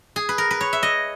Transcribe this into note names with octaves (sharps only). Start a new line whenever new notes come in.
G#4
B4
A#4
B4
C#5
E5
D#5